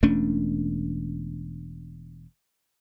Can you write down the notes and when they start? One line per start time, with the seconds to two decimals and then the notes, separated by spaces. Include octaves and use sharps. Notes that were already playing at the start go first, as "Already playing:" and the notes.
0.03 E1 A3 C#4 D4